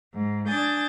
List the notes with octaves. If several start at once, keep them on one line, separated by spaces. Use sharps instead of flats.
G#2
D4 G#5 D#6 G6 A6